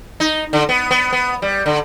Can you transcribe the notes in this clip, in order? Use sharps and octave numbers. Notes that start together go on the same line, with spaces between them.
D#4
D3
B3
B3
B3
G3
D3